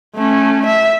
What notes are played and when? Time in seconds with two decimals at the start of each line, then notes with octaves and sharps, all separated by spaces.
0.15 A3 C#4
0.66 E5